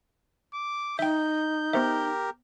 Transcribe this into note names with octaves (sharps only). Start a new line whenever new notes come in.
D6
D#4 E5 G5 G6
B3 G4 A#4 C5 E5